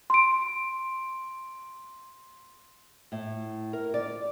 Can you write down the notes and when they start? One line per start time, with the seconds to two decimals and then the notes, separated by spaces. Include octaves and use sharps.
0.10 C6 D7
3.12 A2
3.73 A#4
3.94 D5